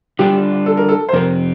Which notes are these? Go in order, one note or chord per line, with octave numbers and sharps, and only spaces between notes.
D3 G3 D4 F4 G4
A4
A#4
A4
C5
F2 C3 F3 C4 A#4